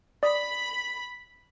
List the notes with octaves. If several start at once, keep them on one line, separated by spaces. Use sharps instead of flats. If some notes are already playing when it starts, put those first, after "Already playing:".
D5 B5 D#6